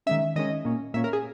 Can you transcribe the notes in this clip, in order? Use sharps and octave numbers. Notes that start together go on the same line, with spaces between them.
D#3 G#3 C#4 E5
D#3 G#3 C#4 D#5
A#2 A#3 C#4
A#2 A#3 C#4 E5
A#4
G#4